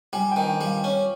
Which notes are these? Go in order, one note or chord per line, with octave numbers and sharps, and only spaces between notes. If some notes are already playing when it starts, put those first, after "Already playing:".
G3 G#5
D#3 G5
G5
G3
F5
C#4